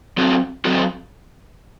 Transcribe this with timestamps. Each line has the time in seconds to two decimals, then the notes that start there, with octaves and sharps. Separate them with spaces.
0.17 F#3 C4 F#4 A4
0.65 F#3 C4 F#4 A4